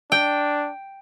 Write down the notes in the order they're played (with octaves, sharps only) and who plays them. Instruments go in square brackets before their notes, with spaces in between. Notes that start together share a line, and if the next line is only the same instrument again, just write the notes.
[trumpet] D4 [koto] G5